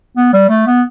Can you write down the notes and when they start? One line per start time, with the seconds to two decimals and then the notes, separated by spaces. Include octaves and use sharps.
0.17 B3
0.33 G3
0.49 A3
0.67 B3